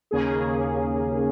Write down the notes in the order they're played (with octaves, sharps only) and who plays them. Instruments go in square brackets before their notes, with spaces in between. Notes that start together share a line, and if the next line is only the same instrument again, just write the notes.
[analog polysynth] D#2 C#3 A#3 C#4 G#4